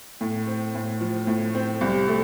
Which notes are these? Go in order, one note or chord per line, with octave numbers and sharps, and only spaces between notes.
A2
C4
A2
F3
A2
C4
C2
A3